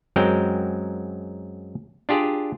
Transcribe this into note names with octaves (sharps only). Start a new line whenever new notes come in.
F#2 F#3 G#3 C4 A#4 G5
D4 F4 G4 G#4 D5